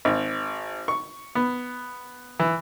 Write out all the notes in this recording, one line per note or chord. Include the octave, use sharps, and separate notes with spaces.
G#1
C#6
B3
E3